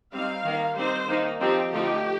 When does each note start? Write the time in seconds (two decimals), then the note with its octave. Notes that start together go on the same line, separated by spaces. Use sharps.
0.12 G3 C4 D#4 F5
0.44 D#3 A#3 D#4
0.76 G3 C4 D#4 C5
1.08 D#3 A#3 D#4
1.40 F3 C4 D#4 G4
1.72 D3 F3 A3 D#4 G4